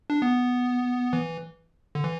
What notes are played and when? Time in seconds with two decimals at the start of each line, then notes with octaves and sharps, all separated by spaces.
0.10 D4
0.22 B3
1.13 E3
1.95 D3
2.04 E3